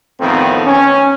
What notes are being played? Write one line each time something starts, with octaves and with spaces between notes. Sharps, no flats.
F2 A2 D#3 A3 B3 C4
C#4